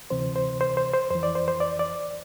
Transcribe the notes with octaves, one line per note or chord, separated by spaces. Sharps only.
D2 C3 E3 C5
C5
C5
C5
C5
F2 E3 C5
D5
C5
C5
D5
D5